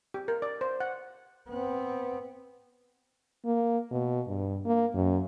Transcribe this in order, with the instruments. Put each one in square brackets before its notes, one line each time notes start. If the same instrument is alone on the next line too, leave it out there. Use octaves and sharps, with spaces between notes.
[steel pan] G4
A#4
D5
C5
F#5
[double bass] B3 C4
[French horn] A#3
B2
G2
A#3
F#2